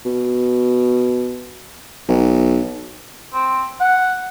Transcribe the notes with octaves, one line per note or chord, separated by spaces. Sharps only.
B2
B1
C4
F#5